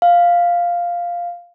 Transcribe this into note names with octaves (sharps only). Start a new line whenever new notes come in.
F5